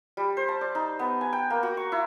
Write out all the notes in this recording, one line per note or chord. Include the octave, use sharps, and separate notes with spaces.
G3
C5
A5
D5
D#4
B3
G#5
G5
A#3
F#4
C#6
E4